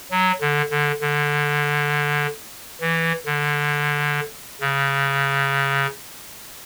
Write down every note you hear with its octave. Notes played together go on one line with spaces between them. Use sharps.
F#3
D3
D3
D3
E3
D3
C#3